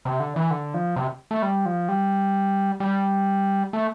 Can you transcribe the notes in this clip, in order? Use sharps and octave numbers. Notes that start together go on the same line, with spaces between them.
C3
D3
E3
D3
F3
C3
A3
G3
F3
G3
G3
A3